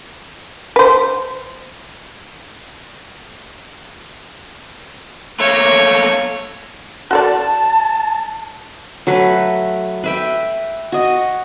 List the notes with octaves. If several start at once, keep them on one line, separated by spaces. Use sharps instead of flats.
B4 C5
A3 A#3 C#5
F#4 A4 D5 A5
F#3 A3 B4
B4 E5 G5
F#4 D#5